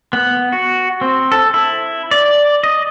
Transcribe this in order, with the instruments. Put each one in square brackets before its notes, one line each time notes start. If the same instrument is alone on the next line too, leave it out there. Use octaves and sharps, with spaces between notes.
[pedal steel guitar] B3
F#4
C4
A4
E4
D5
D#5